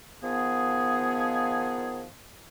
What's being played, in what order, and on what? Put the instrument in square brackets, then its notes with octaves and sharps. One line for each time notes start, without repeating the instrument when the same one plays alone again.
[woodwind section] D#3 F3 B3 G#4